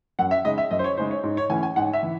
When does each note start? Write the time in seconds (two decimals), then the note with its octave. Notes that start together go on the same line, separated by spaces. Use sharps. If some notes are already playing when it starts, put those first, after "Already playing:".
0.19 F#2 F#5
0.31 E5
0.44 C#3 G#3 D#4 D#5
0.58 E5
0.71 F#2 D#5
0.79 C5
0.84 C#5
0.97 C#3 G#3 D#4 C5
1.11 C#5
1.23 G#2
1.37 C#5
1.50 E3 A3 C#4 G#5
1.63 G#5
1.76 G#2 F#5
1.93 E5
2.03 E3